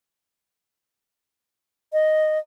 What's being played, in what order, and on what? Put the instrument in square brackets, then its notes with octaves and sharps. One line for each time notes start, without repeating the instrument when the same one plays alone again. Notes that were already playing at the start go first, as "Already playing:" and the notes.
[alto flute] D#5